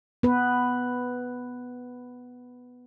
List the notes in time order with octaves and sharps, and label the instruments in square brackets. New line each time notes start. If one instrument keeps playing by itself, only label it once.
[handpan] B3 B4